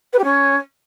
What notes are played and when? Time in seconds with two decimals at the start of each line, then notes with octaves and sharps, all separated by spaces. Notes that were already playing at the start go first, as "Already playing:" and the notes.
0.13 B4
0.18 G4
0.24 C#4